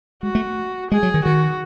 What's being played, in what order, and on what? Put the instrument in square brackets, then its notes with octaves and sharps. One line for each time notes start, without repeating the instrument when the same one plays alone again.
[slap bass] G#3 [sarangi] F#4
[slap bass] A3
[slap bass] G#3 [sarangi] G#4
[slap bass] F#3
D#3
[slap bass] D#3 [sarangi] F#4